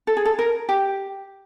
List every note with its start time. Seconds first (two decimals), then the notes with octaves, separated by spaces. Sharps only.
0.07 A4
0.17 G#4
0.25 A4
0.39 A#4
0.69 G4